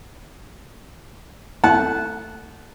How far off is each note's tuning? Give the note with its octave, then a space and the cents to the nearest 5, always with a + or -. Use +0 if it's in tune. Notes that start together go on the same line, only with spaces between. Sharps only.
A3 +20 F#5 -5 A5 -25